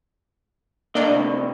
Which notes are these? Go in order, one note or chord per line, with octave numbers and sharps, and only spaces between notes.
D3 A#3 D4 D5 D#5
A2 C3